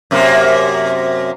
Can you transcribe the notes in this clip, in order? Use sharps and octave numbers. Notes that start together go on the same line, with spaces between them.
F#2 C3 A#3